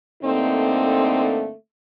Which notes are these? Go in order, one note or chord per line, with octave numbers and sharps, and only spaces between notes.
G2 D3 A3 A#3 C4 D#4